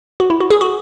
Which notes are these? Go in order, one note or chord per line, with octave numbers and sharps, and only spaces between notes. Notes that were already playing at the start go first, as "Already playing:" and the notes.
F#4
E4
F#4
G#4
F#4